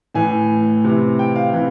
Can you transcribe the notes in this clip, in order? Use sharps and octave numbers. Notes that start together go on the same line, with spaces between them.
A2 E3 G#5
C3 E3
G5
F5
C3 E3